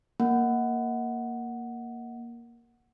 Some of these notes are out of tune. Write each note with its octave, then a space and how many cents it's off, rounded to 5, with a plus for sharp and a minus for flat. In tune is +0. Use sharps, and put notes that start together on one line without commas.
A#3 +0 F#5 +0